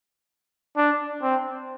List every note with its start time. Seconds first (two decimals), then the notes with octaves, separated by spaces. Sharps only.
0.77 D4
1.22 C4